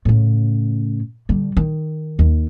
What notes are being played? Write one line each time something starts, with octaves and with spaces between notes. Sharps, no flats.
A2 C#3
D3 G3
D#3
D#2